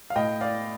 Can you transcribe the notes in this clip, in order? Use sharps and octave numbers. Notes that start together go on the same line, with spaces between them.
F5
A2 D#5 G5
D5 F5